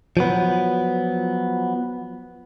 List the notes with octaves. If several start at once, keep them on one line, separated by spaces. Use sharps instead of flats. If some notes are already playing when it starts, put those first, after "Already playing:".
F3 F#3 B3